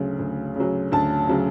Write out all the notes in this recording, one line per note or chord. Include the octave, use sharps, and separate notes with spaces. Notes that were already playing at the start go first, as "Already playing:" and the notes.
Already playing: D2 C#3 F#3
D2
C#3 F#3
D2 A5
C#3 F#3